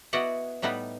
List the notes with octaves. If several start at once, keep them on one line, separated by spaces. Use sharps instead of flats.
B3 E4 F#4 D5 D#5 F#5
A2 G3 B3 D#4 B4